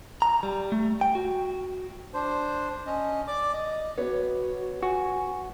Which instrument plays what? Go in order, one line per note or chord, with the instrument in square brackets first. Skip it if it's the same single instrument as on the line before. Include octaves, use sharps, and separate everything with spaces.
[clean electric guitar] A#5
G3
A3
G5
F#4
[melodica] D4 C5
C#4 D#5
D5 D6
D#5
[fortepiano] B3 C#5 [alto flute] F#4
[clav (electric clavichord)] F#4 [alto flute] G#5